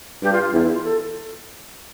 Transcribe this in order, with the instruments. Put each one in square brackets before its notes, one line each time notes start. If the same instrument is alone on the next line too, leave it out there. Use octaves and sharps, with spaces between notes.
[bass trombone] G2 [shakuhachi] G4
[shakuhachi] F4
F4
[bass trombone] E2 [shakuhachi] E4
[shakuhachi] E4
F4
A4